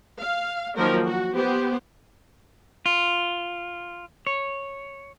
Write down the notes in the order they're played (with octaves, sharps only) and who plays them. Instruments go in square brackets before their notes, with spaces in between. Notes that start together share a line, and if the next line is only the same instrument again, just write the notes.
[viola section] F5
D#3 F3 F#3 A#3 A#4
F#4
B3 G4 C5
[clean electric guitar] F4
C#5